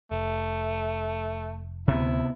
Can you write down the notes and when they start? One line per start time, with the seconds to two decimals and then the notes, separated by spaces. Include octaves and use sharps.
0.11 F1 A3
1.88 D2 C3 B3 E4